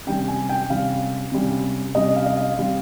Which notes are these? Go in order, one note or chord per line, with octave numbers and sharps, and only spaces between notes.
C3 G3 C#4 G5
G#5
G5
C3 G3 C#4 F5
C3 G3 C#4
C3 G3 C#4 D#5
F5
D#5
F5
G3 C4